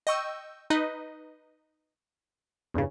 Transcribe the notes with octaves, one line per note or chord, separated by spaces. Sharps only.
D#5 G5 C#6 E6 G6
D#4 B4 D#5
E2 G2 C#3